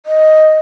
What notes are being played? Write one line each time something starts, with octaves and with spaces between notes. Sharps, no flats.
D#5